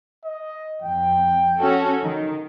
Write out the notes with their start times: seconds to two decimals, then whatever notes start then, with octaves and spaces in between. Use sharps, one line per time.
0.24 D#5
0.82 F2 G5
1.58 C#4 F#4 A4
2.03 D#3 D#4